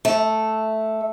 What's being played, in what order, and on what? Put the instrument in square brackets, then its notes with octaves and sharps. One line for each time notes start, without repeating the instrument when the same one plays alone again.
[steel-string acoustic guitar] A3